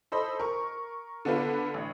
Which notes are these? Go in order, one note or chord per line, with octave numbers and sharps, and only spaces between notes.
A4 C5 D#5 B5
A#4 C#6
D3 B3 D4 F4 B4
A1